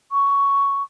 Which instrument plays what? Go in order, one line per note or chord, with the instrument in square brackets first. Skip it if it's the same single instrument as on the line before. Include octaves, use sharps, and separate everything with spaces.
[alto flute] C#6